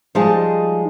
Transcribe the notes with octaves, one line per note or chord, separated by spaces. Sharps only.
F3 G3 G#3 D#4 G#4 A5